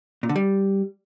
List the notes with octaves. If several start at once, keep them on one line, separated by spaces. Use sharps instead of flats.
A#2
D3
G3